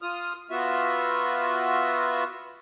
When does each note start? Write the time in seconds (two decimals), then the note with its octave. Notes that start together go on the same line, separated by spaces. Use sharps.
0.02 F4 D#6 F6
0.51 B3 F4 F#4 E5